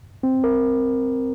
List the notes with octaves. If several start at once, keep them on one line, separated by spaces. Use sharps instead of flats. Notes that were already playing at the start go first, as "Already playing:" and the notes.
C4
A#4